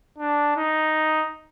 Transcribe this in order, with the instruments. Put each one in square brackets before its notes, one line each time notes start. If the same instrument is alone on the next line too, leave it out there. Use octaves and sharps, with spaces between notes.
[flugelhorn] D4
D#4